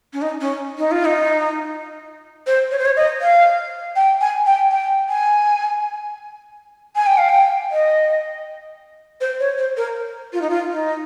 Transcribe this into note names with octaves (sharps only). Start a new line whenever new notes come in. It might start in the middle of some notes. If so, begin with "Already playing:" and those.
C#4
D#4
C#4
D#4
F4
D#4
C5
C#5
C5
C#5
D#5
F5
G5
G#5
G5
G5
G#5
G#5
G5
F5
G5
D#5
C5
C#5
C5
A#4
F4
D#4
F4
D#4